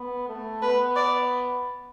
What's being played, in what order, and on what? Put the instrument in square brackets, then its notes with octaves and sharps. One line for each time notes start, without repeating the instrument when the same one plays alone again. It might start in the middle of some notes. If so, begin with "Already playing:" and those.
Already playing: [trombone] B3
A3
[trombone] B3 [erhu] B4
[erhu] D5